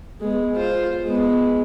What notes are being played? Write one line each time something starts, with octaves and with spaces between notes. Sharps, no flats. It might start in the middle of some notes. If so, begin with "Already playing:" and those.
G#3 B3
F4 C5
G#3 B3